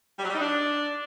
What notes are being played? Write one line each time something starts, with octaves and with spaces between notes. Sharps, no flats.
G3
F#3
G3
D#4
D4